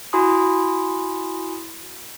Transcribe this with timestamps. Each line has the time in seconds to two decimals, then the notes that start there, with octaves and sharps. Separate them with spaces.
0.13 E4 F#4 G#5 B5 C6 D#6